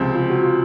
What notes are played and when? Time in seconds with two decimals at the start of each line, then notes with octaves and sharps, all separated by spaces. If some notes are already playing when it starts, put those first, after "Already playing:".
Already playing: C#2 C3 F3 C4
0.15 F4
0.30 F#4
0.45 F4